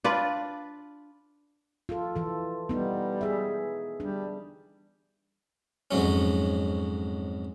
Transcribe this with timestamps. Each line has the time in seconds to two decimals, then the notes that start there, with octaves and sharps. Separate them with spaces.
0.04 D4 F4 B4
1.89 F4 A4
2.16 E3 A4
2.69 G3 B3 D#4
3.21 G#4 E5
4.00 G3 D4
5.91 F2 G#2 F#3 C#4